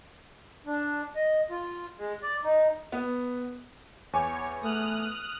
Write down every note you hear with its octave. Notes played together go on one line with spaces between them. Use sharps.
D4
D#5
F4
G#3
D5
D#4
B3
E2 C#5 G#5 D6
A3 D#6 F6 F#6